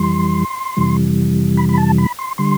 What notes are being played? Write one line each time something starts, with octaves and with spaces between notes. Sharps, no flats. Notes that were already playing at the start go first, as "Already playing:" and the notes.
Already playing: F2 E3 G3 C6
F2 C3 E3 G3
B5
B5
A5
B5
C6
D3 G3 C6